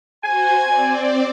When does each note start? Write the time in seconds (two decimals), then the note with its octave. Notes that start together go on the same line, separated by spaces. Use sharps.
0.24 F#4 C5 G#5
0.64 C4 D5